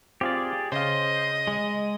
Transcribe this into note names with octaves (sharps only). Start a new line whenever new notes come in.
C4 F4 G4 G#4 D5 F5
C#3 C5 D#5 F5
G#3